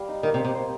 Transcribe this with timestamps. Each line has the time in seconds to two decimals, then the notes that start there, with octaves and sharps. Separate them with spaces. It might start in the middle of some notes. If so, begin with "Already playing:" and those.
Already playing: G3 F5
0.08 D#4
0.23 D#3 A#3
0.34 C3
0.39 A#3
0.44 C3
0.55 C5